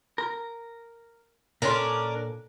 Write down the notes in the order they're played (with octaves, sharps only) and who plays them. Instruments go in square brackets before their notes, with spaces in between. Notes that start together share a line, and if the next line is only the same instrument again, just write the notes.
[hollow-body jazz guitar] A#4
[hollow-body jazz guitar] A#2 A4 C6 [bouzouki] C#4 D4 A#4